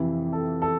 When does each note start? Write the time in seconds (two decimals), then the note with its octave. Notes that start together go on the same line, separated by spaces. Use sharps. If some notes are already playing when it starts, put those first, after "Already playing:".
Already playing: F2 C3 E3
0.32 A4
0.62 A4